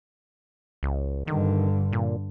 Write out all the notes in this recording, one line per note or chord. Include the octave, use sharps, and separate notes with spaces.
C#2
G2 D3 D#3
A#2